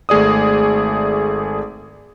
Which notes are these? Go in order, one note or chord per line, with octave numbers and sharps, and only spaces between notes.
G#1 A3 G#4 D5 D#6